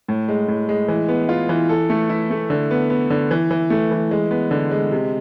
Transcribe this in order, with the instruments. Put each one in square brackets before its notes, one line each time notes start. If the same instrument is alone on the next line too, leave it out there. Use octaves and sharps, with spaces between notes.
[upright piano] A2
G#3
A2
G#3
E3
B3
F4
E3
A4
A3
E4
A3
D3
B3
B3
D3
E3
E3
A3
E3
G#3
B3
D3
G#3
C3